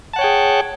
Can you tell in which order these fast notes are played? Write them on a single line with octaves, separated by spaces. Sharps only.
A5 F#5 C#5 G5 G#4